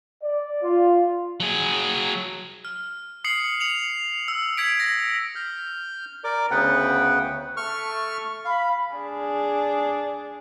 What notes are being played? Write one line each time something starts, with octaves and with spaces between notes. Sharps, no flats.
D5
F4
F#3 G#4
F6
D#6 C7 C#7 F#7
C#7 F7 F#7
E6
G#6 B6 D7
A#6
F6 G6
A#4 D5 D6
D2 C#3 B3 B4 F#5 G5
A3 C#6 F6
F5 B5
D4 G#4